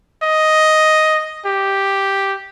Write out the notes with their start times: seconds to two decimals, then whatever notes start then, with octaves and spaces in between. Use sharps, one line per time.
0.23 D#5
1.45 G4